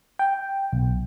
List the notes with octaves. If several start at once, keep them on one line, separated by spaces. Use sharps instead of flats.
G5
B1